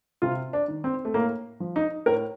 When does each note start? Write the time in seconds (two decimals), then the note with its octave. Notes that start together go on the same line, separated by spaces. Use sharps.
0.22 C3 F4
0.53 D4
0.68 D#3
0.84 C4
1.05 A3
1.14 A2 A#3
1.60 F3
1.76 D#4
2.06 A2 A#4